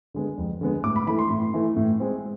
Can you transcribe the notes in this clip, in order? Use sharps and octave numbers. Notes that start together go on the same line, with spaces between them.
D3 G#3 B3
F2
D3 G#3 B3
A2 D6
B5
E3 A3 B5
C6
A2
E3 A3
A2
G#3 C4